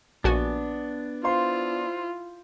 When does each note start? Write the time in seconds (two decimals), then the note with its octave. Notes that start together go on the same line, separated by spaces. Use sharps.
0.24 A#1 B3 D4 F#4 G#5
1.24 E4 F4 C5 F5 C6